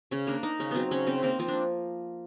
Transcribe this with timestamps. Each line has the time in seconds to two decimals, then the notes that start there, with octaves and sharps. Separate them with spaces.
0.11 C#3 C#4
0.27 A#3 D4
0.43 A#3 D#4
0.59 C#3 C#4
0.71 F#3 B3 C4
0.91 C#3 C#4
1.07 C#3 C4
1.23 A#3 C4
1.39 F3 C4
1.48 D4